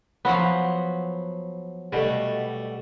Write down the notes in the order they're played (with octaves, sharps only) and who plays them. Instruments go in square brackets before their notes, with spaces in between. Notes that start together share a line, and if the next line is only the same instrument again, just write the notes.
[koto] F3 F#3 B3
[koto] B2 [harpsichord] G3 A3